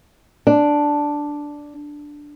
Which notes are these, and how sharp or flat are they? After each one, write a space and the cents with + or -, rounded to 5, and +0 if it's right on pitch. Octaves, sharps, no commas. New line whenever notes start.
D4 +0